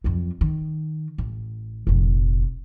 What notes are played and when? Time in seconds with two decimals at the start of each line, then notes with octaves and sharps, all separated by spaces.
0.04 F2 F#3
0.41 D#3
1.18 A1
1.87 F1 A#1